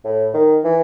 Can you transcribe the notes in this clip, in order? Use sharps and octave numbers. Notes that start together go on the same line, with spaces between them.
A2
D#3
E3